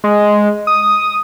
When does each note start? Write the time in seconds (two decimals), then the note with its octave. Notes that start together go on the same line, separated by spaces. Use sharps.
0.04 G#3
0.67 D#6